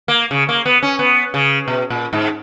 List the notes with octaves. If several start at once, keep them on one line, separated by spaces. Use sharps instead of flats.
A#3
C#3
A#3
B3
C#4
B3
C#3
B2
A#2
G#2